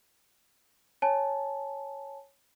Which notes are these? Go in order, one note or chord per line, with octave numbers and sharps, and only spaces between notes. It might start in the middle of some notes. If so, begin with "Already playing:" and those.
C#5 G#5 A5